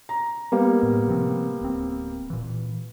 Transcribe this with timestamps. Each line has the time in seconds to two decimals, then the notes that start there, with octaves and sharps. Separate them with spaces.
0.09 A#5
0.52 G3 A#3 B3
0.83 A2
1.07 C3 F3 C4
1.61 D1 C4
2.30 A#2 E3